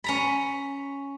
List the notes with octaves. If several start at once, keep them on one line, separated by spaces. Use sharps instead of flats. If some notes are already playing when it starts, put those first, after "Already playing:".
C#4 A#5 B5